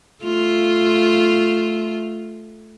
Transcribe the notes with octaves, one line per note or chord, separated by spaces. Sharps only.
A3 F4